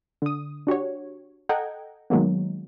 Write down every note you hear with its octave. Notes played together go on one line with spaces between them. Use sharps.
D3 D#6
D4 F#4 G4 C#5
A4 D#5 F#5 G5 A#5 G#6
D#3 F#3 G#3 A#3 B3